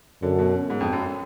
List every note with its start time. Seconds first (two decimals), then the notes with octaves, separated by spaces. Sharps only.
0.22 F#2 D3
0.39 B2
0.70 G#2
0.80 F2
0.93 F#2